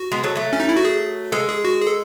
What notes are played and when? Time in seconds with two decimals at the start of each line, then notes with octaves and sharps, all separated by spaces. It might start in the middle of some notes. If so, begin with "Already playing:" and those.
Already playing: F#4
0.12 G#3 B3
0.23 F#3 A3
0.36 F#3 A3
0.53 C#4
0.60 D#4
0.69 E4
0.77 F#4
0.85 G#4
1.32 G#3 A4
1.49 G#4
1.65 F#4
1.81 G#4
1.87 A4